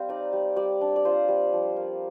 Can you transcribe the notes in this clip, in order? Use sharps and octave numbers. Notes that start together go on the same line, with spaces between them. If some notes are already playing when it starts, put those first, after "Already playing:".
Already playing: G3 C4 F5 G5
D#4 D5
G3
G3 D5
D4
D5
F4 C5
G3
F3
A#3